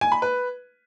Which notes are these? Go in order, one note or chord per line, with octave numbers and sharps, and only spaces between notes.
G#5
B5
B4